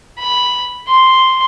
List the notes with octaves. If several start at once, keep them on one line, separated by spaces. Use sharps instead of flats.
B5
C6